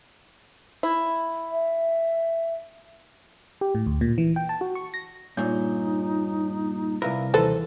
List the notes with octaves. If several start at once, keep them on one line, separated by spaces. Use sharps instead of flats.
E4
E5
G4
A2
D2
A#2
E3
G5
A5
F#4
C#6
A#6
G2 A#2 D#4 C#5 G#5 G6
C2 E4 A#4 B4 E5 F5
D#2 E3 A4 B4 C5